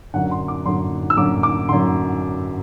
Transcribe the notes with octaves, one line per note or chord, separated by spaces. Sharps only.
F#2 D3 F#5
C6
D6
F#2 D3 C6
E6
F#2 D3 D6
D6
F#2 D3 C6